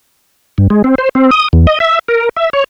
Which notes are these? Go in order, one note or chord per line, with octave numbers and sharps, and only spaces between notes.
G2
G#3
C4
C5
C4
D#6
E2
D#5
E5
A#4
E5
C#5